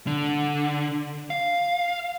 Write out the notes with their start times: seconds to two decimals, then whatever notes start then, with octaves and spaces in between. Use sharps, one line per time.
0.07 D3
1.30 F5